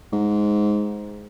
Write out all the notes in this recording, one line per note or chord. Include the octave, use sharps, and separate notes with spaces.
G#2